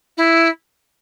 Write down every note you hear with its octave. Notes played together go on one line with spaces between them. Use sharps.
E4